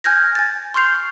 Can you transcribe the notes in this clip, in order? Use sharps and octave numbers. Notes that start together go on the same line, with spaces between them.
G#5 F6 G6 G#6 A#6
G#5 A6
C6 C#6 F6 G6 C7 F7